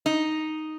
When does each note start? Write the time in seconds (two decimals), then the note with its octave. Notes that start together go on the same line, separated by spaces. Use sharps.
0.06 D#4